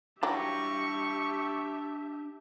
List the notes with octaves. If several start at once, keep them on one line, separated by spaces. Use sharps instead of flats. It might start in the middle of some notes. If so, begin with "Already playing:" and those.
E3 F#3 D4 G4 E5 G5 C#6